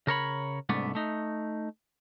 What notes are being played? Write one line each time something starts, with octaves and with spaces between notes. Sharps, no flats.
C#3 A#4 C#5 B5
C2 G#2 A3 B3 D4
A3 D#4